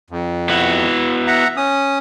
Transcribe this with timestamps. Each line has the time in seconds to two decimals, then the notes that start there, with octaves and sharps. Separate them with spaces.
0.10 F2
0.49 B3 E4 F#4
1.27 E5 F#5 A#5
1.57 C#4 D#6